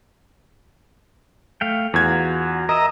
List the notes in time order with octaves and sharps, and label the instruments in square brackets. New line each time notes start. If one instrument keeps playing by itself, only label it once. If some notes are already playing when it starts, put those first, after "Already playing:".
[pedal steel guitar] A3 F5 G5
[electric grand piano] E2 G#6 [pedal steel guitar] F4 F#4
[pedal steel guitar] A#4 E5 [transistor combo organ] D#5 A#5